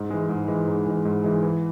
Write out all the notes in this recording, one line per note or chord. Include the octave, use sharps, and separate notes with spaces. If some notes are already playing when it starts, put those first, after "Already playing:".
Already playing: G#2
E3 G#3
G#2
E3 G#3
G#2
E3 G#3
G#2
E3 G#3
E3